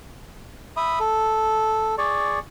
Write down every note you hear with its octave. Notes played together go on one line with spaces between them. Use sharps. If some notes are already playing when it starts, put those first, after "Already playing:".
E5 B5 D#6
A4
G#4 D5 C#6